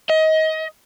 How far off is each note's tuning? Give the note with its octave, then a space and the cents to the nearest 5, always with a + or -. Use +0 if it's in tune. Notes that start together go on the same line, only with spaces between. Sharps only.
D#5 +25